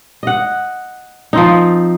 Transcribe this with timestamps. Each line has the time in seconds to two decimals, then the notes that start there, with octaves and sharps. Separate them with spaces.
0.23 D#5 F#5
1.33 F3 C4 D#4